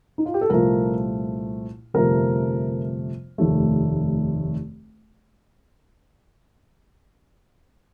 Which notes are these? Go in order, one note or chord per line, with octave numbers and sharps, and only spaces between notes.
D#4
F4
G4
A4
C2 A#2 F3 A3 A#4
G1 F2 C3 F3 A3 A#4
F1 D#2 D#3 A3